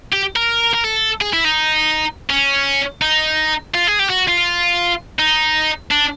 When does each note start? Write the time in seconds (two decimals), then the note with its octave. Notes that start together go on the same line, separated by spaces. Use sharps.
0.13 G4
0.36 A#4
0.74 A#4
0.84 A4
1.21 G#4
1.33 E4
1.45 D#4
2.30 C#4
3.02 D#4
3.74 F4
3.87 G#4
4.00 G4
4.10 F#4
4.28 F4
5.19 D#4
5.91 D4